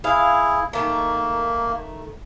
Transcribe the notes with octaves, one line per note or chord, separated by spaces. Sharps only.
E4 G#4 F5
D#3 A3 A#3